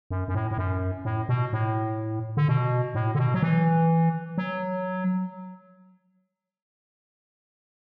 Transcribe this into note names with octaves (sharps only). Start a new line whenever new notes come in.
F#2
F#2
A2
A2
F#2
A2
B2
A2
D3
B2
A2
D3
B2
F#3
E3
F#3